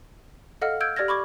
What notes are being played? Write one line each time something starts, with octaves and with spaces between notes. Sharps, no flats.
A4 D#5 F5 F#5 F6
E6 F6 G6 G#6 D7
G4 D5 F6 G#6 A#6
B5 C#6 D6 G#6